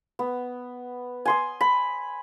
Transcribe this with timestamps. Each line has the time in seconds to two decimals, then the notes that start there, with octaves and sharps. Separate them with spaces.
0.19 B3
1.25 G#5 C6 D#6
1.61 B5